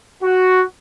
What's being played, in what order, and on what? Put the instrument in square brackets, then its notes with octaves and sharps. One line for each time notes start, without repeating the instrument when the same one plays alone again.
[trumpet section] F#4